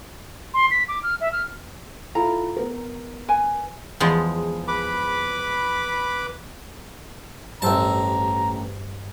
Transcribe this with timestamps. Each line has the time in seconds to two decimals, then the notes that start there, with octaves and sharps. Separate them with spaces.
0.54 C6
0.71 B6
0.88 D6
1.03 F6
1.21 E5
1.32 F6
2.15 E4 F4 A4 A#5
2.57 B3 A#4
3.28 B4 G#5
4.00 E2 F3 G#3
4.68 B4 B5 D6
7.62 A1 G2 C5 A5 A#5 E6